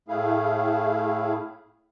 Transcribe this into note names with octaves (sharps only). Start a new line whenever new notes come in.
A2 A3 E4 G#4 F5